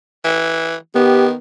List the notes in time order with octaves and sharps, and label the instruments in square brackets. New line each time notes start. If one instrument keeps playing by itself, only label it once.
[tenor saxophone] E3
[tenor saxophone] D#3 [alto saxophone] B3 [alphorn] G4